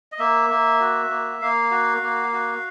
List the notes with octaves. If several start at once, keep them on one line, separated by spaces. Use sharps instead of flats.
D#5
A#3 E5
A#3
F#4
A#3
A#3 F5
F#4
A#3
F#4